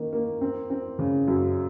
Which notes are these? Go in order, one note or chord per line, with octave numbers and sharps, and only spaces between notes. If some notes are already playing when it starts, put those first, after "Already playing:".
Already playing: D#3 A#3
A#3
C4
C4
C#3
F#2